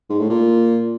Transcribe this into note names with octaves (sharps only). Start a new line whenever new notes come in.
G#2
A2
A#2